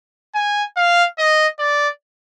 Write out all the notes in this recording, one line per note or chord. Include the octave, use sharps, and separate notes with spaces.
G#5
F5
D#5
D5